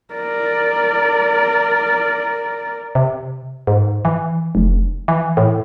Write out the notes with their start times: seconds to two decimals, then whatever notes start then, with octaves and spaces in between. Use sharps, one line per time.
0.14 A#4 D5
2.95 C3
3.67 G#2
4.05 E3
4.55 F1
5.08 E3
5.37 A2